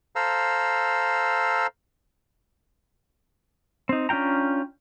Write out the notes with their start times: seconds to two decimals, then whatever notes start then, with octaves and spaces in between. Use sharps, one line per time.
0.16 A4 C5 F5 A#5 E6
3.89 C4 D#4
4.09 C#4 D4 F4 G5 A#5